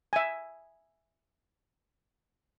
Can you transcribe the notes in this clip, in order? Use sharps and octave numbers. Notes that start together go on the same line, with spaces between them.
E5 G#5